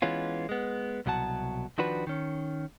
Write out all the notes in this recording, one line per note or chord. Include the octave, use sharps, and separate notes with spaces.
E3 G#3 B3 C#4 F4
G#3 B3
C2 B2 F#3 F#5 A5
D#3 F3 D4 F#4 B4
D#3 C#4